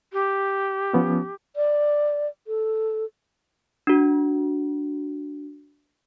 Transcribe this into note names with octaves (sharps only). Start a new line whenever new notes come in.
G4
F3 B3 C#4
D5
A4
D4 F#4